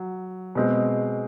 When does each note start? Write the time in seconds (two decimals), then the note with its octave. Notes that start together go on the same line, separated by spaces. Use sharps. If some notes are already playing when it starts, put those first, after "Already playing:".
Already playing: F#3
0.55 B2 G#3 C4